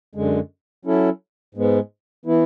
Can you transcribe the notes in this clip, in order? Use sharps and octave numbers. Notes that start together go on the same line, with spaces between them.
F#2 D3 G#3
F#3 C#4 E4 A4
G#2 G#3 B3
E3 B3 E4